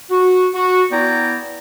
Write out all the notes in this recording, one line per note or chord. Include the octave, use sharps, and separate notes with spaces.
F#4
F#4
B3 E4 D5 G5 A#5